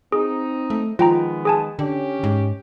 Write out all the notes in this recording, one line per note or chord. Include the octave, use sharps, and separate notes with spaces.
C4 D#4 G#4
A3
D#3 F3 G#3 B3 F4 G5 A#5
G#4 G#5 A5
D3 C#4 G4
G#2